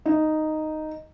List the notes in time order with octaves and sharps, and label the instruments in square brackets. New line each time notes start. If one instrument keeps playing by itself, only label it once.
[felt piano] D#4